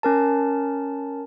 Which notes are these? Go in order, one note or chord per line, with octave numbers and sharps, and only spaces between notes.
C#4 A#4 A5